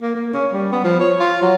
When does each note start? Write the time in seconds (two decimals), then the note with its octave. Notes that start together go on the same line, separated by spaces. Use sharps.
0.02 A#3
0.16 A#3
0.34 C#4
0.52 G3
0.72 B3
0.85 F3
1.00 C#5
1.20 F4
1.42 F#3